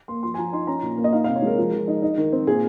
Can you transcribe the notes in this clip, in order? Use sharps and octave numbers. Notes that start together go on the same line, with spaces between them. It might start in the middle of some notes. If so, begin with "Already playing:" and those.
A#3 C6
F3 C6
G#5
F3 A#5
D#4 C6
C#4 A#5
A#2
A#3
D#5
D#4 F5
F5
C3
C#5
G#3 A#4
F3
F3
D#4
D#4
D#3
C4
A#2 G#4